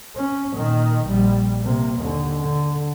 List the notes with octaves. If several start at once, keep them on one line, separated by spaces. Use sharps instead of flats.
C#4
A#2 D#3
A#1 G3
C3 A#3
D#2 D3
D3